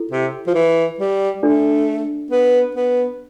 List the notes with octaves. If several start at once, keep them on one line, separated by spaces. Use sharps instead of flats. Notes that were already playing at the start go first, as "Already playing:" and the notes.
Already playing: E4 A4
C3
F3
E3
G3
A3 D4 A4 D5
B3
B3